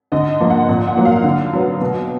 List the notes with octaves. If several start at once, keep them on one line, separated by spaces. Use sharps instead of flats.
D3 D#5
F3 A#3
F#5
A#2
F#5
F#3 A#3
F5
D3
F#3 B3
B2